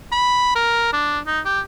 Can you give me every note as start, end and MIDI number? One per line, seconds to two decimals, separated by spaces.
0.12 0.55 83
0.55 0.93 70
0.93 1.19 62
1.27 1.40 63
1.45 1.60 67